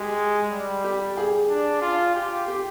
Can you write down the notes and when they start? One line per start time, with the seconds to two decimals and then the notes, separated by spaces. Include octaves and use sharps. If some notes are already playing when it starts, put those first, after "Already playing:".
Already playing: G#3 G4
0.51 G3
0.84 G4
1.17 G#4
1.49 D4
1.82 F4
2.15 G4
2.48 G4